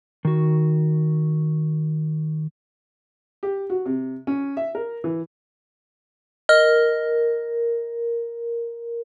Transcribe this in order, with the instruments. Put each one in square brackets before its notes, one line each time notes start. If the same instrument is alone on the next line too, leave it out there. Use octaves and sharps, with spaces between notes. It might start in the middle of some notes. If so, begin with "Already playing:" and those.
[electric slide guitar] D#3 F#4
[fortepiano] G4
F#4
C3
C#4
E5
A#4
E3
[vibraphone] A#4 [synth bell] D#5 F6